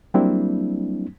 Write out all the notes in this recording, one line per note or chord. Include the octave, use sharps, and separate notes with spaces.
F#3 G3 A#3 C4 D4 E4